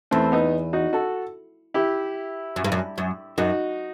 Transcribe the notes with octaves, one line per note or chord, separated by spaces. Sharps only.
E2 A3 C4
B3 D#4
D#4 F#4
F#4 A4
E4 G4
F#2
G2
F#2
F#2
F#2 D#4 F#4